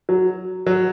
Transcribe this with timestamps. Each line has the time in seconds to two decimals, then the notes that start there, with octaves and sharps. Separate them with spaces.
0.09 F#3
0.66 F#3